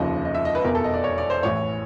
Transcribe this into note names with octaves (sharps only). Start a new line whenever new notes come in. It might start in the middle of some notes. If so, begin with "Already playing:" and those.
Already playing: F1 D#2 C#3 F3 D#5
D#5
E5
D#5
B4
F1 E2 B2 A#4
A4
D#5
D5
C#5
D5
C5
A1 A2 E3 C#5